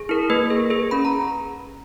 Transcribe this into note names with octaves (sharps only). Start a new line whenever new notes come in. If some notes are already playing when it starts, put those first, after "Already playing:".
Already playing: G#4
E4 A#4
A#3 B4
G#4
G#4 B4
C#4 B5
A#5